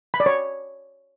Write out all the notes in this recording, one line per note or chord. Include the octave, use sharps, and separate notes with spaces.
B5
D5
C#5